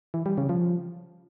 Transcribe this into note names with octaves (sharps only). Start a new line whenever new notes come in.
E3
G3
C#3
F3